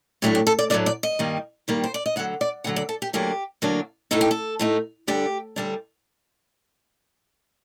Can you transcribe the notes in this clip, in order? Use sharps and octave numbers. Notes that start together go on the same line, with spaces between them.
A2 F#3 A3 D4 G4
G4
A4
D5
A2 F#3 A3 D4 D5
D5
D#5
G2 D#3 G3 A#3
G2 D#3 G3 A#3
C5
D5
D#5
D2 D3 F#3 F#5
D5
D2 D3 F#3 F#5
D5
A4
G4
D2 D3 F#3 A#3 D4 G4
D2 D3 F#3 A#3 D4
A2 A3 D#4 A4
G4
A4
A2 A3 D#4
D2 D3 G3 D4 G4
D2 D3 G3 D4